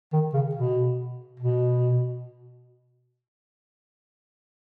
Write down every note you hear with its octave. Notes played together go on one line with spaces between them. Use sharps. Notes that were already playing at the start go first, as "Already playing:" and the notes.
D#3
C#3
B2
B2